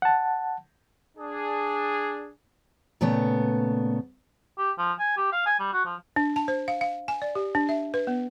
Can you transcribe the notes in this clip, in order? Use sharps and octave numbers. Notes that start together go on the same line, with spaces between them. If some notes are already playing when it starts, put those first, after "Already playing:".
F#5 A5
D4 G#4
A#2 C#3 A3 B3
G4
F3
G#5
G4
F5
G#5
G3
F#4
F3
D4
A5
C5
F5
F5
G#5
D5
G4
D4
E5
B4
B3